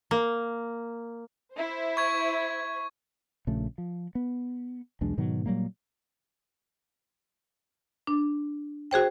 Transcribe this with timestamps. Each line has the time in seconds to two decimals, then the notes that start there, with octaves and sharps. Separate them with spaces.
0.11 A#3
1.54 E4 C5
1.97 C#6 G#6
3.47 A#1 C#3 A3
3.78 F3
4.15 B3
5.01 B1 E2 G#3 D4
5.17 G#2 B2 D#3 F#3
5.46 A#2 F#3 G3 A#3
8.07 D4
8.91 F#4 G#4 C5 G5